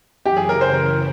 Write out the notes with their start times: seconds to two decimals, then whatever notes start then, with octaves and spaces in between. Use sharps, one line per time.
0.24 F#2 C#3 E3 G4
0.36 G#4
0.49 A#4
0.61 C5
0.74 A#4